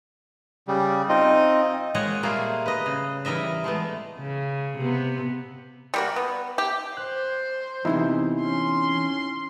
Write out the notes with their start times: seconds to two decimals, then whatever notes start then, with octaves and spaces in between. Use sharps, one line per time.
0.68 C#3 G3
1.09 C4 D#4 F4 D#5
1.94 A#2 G#3 C#5 D#5 F#5
2.23 G3 A3 A#3 F4 G#4
2.66 B4 D#5
2.86 C#3
3.25 E3 G3 A#4 D#5 E5
3.64 G#3 A3 B3
4.19 C#3
4.78 C3 B3
5.94 G3 A#3 F#4
6.16 B3
6.58 G4
6.97 C5 F#6
7.85 E2 A2 C3 E3 D#4 E4
8.41 C#4 C6